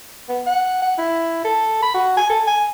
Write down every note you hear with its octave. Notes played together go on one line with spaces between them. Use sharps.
B3
F#5
F#5
E4
A4
B5
F#4
G#5
A4
G#5